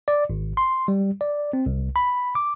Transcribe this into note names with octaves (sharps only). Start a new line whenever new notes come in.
D5
G#1
C6
G3
D5
C4
C2
B5
D6